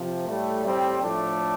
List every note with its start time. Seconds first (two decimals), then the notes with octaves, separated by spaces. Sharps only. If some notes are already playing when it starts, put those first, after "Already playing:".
Already playing: C3 F3
0.27 A2 G3 A3
0.64 G3 C4
1.01 A2 F3 A3 D4